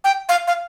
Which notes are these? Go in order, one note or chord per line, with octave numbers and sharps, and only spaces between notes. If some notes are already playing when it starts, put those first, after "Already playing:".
G5
F5
F5